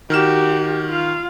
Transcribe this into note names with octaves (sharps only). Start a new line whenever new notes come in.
D#3 F#4 G4 F6 E7
F4 F5